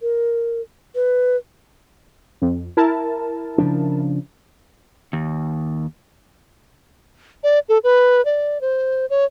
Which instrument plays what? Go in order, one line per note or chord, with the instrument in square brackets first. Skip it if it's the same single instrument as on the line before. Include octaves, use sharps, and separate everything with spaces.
[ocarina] A#4
B4
[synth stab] F2
E4 A#4 A5
[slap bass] C#3 F3 D4
[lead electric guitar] D#2
[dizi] D5
A4
B4
D5
C5
C#5